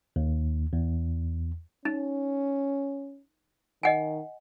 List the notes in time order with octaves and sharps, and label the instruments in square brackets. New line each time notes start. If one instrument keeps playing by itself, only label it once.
[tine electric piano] D#2
E2
[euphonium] C#4 [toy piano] D#4
[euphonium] D#3 [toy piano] D#5 F#5 G#5